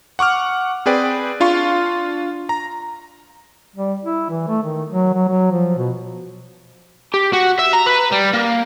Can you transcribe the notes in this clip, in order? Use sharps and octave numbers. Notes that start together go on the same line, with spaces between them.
F#5 C#6 D6 F6
C4 G#4 B4 D5 G5
D4 F4 F5 C6 C#6
A#5
G3
E4
E3
A3
D#3
F#3
F#3
F#3
F3
B2
G4
F#4
E5
A#5
B4
G3
A#3